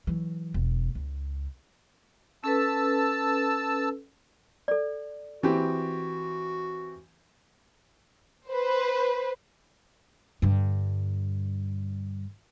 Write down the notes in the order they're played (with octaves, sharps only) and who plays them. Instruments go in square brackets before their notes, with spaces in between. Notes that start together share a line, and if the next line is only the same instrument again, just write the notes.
[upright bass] E3 F#3
E1
C#2
[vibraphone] C#4 A4 B4 [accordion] A5 E6
[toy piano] A4 D5
[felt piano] E3 C4 G4 [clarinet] F#4
[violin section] B4 C5
[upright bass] G2 D3